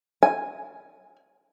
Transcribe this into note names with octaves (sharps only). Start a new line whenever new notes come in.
G#5